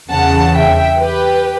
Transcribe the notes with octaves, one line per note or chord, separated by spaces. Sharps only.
E2 C#3 E3 F#5 A5
E5 G5
G4 B4